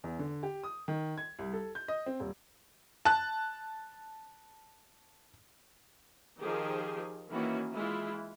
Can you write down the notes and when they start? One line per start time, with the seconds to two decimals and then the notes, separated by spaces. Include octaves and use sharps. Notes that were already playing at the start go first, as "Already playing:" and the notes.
0.04 E2
0.19 D3
0.43 G4
0.63 D#6
0.88 D#3
1.18 G#6
1.39 C2
1.53 A4
1.75 G6
1.88 D#5
2.06 C4
2.20 D#1
3.05 A5 F#6
6.41 D#3 F3 G4 G#4
7.29 D#3 E3 A#3 C#4 F#4
7.71 E3 G#3 E4 F4